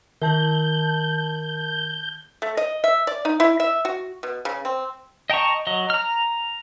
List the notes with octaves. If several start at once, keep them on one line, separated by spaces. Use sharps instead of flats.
D#3 A#4 A5 G6 F#7
A3
D#5
E5
D5
D#4
E4
E5
F#4
B2
C#3
C4
D#5 G5 A5 A#5 C#6
F#3 D#5
A#5 F6